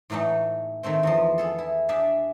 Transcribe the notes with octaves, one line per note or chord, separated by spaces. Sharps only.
A2 E3 F#3 A3 D#4
D#3 F#3 A3 C4
E2 E3 F3
B3 G#4 A4
E4
D4 G4 G#4 D5 E5